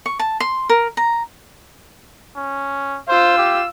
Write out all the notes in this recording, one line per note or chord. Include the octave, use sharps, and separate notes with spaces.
C#6
A5
C6
A#4
A#5
C#4
F4 C5 E6
G4